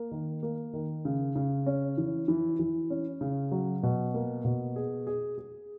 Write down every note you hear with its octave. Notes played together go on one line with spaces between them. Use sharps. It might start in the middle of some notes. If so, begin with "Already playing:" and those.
Already playing: A#3
D#3
A#3
D#3
C#3
C#3
C#4
E3
E3
E3
C#4
C#3
F#3
B2
A#3
B2
G#4
G#4
G#4